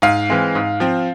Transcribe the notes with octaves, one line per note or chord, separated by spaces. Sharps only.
G#2 F5
E3 G#3 C4
G#2
F3 C4